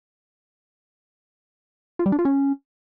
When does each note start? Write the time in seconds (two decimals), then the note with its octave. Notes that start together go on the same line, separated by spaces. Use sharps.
1.99 F4
2.06 G3
2.12 D4
2.19 F4
2.25 C#4